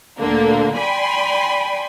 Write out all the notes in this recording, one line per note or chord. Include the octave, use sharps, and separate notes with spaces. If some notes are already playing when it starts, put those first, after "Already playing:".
D2 A#2 D3 A#3
D5 G5 G#5 B5 C6